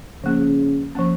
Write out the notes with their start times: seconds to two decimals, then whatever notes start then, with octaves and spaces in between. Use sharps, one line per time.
0.24 C#3 F3 A#3 C#4
0.95 F3 A#3 C#4